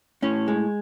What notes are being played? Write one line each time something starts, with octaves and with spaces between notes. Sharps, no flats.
A2 C#4
G#3